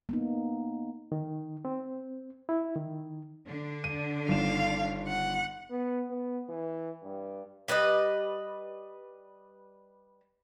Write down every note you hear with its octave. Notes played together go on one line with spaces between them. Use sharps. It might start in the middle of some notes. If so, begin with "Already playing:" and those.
A#3 B3 D#4
D#3
C4
E4
D#3
D3 D4
D#7
G1 D#3 F5 E7
F#5
B3
B3
E3
G2
G3 B4 D5 D#5